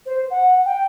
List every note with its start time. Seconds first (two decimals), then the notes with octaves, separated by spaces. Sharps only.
0.06 C5
0.30 F#5
0.65 G5